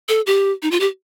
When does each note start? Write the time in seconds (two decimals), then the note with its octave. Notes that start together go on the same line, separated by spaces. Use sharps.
0.09 A4
0.26 G4
0.62 D#4
0.71 F4
0.80 G4